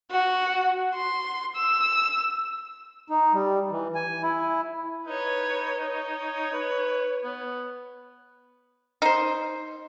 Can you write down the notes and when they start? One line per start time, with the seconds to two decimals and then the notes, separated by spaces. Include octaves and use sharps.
0.11 F#4
0.95 C6
1.55 E6
3.09 D#4
3.34 G3
3.72 E3
3.95 G#5
4.23 E4
5.07 D#4 B4 C#5
5.84 C#5
6.53 B4
7.24 B3
9.02 D#4 C5